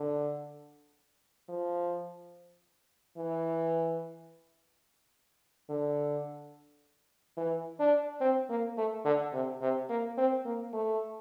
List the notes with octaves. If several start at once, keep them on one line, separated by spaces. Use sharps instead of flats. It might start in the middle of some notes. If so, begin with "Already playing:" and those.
Already playing: D3
F3
E3
D3
E3
D4
C4
A#3
A3
D3
C3
C3
A#3
C4
A#3
A3